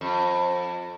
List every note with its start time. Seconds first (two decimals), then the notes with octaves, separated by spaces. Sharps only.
0.01 F2